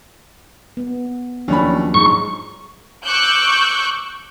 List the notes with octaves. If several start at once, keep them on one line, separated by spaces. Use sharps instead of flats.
B3
D#2 F3 F#3 C#4 D4 B5
G#2 C#6
C#6 D6 E6 F#6 G6